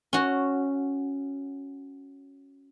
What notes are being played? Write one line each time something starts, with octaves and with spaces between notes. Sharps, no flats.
C#4 F#4